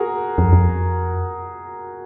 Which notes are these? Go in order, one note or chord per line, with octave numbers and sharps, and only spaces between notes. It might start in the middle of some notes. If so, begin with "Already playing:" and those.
Already playing: F#4 G#4 A#4
F2
F2